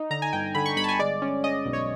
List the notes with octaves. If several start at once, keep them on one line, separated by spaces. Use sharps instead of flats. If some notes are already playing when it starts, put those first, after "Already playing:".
Already playing: D#4
D3 A#5
G#5
G1 G5
D3 B5
C#6
G1 B5
A5
G#5
G#3 D5
C#4
C#4 D#5
B1
C#5